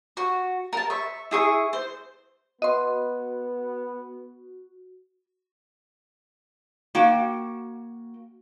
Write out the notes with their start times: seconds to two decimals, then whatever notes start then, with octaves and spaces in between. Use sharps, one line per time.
0.17 F#4
0.73 A#4 A5
0.90 E5 C#6
1.31 E4 G#4 C#6
1.73 C5
2.62 B3 F#4 D#5 C6
6.95 A#3 F#4 G5